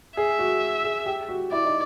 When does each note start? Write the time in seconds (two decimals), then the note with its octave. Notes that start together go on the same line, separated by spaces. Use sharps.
0.17 G#4 E5
0.39 F#4
0.84 G#4
1.06 G4
1.29 F#4
1.52 E4 D5
1.65 D#4